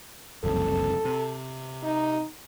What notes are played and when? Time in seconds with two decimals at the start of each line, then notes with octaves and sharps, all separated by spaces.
0.44 F#1 C2 F2 A4
1.05 C3
1.83 D#4